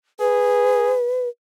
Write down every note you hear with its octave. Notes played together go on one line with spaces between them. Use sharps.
G#4 B4